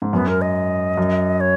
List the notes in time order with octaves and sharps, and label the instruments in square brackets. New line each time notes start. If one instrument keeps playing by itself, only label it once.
[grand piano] G#2
[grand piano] F#2 [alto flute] B3
[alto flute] A#4
D#5
[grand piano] F#2
[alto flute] C#5